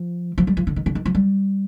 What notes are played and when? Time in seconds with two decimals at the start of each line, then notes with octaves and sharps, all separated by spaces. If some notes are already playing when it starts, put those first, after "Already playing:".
Already playing: F3
0.38 F3
0.47 G3
0.57 F3
0.67 D3
0.76 D#3
0.86 D3
0.95 D#3
1.06 F3
1.15 G3